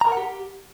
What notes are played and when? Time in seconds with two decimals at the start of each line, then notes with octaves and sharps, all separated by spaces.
0.01 A#5
0.07 A#4
0.12 F#5
0.17 G4